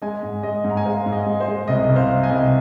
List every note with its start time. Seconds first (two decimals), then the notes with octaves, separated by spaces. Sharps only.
0.02 G#3 D#5 G#5
0.23 G#2
0.43 G#3 D#5
0.64 G#2
0.70 A#5
0.77 G#5
0.85 G#3 C5 F5
1.06 G#2
1.12 D#5
1.26 G#3
1.40 C5
1.47 G#3
1.68 C2 D#5
1.84 C2 D#5
1.95 C5 F5
2.09 C3
2.23 D#5 G#5
2.31 C2